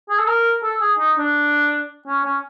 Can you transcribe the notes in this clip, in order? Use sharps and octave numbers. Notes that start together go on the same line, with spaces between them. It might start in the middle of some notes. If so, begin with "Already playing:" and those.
G#4
A4
A#4
A4
G#4
D#4
D4
C#4
C#4